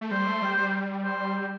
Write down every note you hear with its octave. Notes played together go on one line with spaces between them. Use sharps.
A3
G3 C5
A3
G3
G3
C5